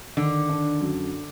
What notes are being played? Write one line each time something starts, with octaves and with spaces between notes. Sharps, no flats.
D3 D#3
D4
F#2